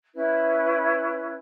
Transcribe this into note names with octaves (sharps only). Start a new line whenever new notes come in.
C#4 E4 B4